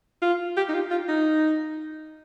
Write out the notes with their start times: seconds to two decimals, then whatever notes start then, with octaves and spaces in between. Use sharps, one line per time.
0.22 F4
0.57 G4
0.69 D#4
0.74 F4
0.90 F4
1.08 D#4